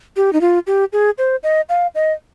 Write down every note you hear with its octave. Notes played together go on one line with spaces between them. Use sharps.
G4
D#4
F4
G4
G#4
C5
D#5
F5
D#5